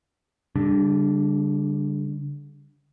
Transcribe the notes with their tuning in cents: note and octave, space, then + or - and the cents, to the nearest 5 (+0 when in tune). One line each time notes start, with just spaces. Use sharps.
D3 -40 G3 +15 D4 +0